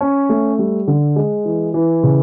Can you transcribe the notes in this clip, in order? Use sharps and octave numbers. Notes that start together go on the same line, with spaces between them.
C#4
A3
G3
D3
G#3
E3
E3
C#3